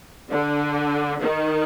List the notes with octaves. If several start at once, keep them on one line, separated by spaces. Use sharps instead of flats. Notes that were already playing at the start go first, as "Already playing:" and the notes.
D3
D#3